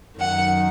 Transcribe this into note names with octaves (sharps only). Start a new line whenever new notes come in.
F#2 D#3 F#5